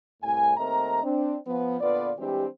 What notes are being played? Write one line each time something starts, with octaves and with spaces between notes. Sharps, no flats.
C2 A2 G#5
D#2 A3 C4 A#4 D#5 A#5
C4 D4
F3 B3
A#2 D3 B3 F4 B4 D5
E3 G3 G#3 C4 D4 G4